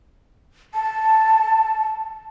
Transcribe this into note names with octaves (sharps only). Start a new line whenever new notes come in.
A5